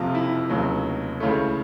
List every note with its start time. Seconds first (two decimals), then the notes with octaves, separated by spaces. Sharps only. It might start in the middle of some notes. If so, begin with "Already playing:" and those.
Already playing: F#1 F2 C3 F3 F4
0.15 E4
0.49 F1 D#2 C#3 F#3
1.20 C#2 C#3 E3 A3